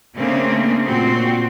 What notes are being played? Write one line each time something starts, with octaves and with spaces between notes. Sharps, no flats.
C#3 A3 A#3 C4 D4
A#2 C4 F#4